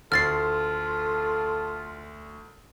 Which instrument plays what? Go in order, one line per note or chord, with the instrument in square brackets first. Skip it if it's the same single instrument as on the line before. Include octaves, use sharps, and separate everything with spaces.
[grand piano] D2 [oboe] F4 [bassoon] A4 [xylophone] F6 A6 C7